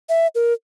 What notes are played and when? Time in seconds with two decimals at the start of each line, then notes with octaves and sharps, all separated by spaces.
0.09 E5
0.35 A#4